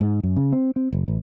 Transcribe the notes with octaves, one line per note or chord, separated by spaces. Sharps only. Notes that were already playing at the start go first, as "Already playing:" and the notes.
G#2
F#2
C#3
C4
C4
F#1
A1